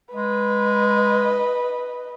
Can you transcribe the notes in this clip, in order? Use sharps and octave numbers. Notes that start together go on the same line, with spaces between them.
G#3 B4 D#5